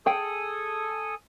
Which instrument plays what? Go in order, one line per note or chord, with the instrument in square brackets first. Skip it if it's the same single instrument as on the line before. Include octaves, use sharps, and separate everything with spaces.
[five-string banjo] G#4 G5 [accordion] A4 G#5 D#6